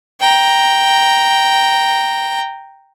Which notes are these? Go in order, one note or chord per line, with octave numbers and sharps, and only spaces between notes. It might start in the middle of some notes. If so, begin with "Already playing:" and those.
G5 A#5